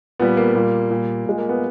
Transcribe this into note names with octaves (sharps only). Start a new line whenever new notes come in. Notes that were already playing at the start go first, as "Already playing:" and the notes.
A#2 G3 B3
A#3
A#2 G3
A#2 G3
A#2 G#3
A#3
B3